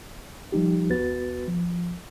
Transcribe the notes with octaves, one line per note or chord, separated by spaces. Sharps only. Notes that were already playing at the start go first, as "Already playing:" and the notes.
F3 G3 D#4 G4
D#2 B3 F#4 B4 A6
F3